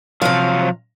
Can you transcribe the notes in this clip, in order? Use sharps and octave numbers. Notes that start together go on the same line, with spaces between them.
C3 F3 F#3 F5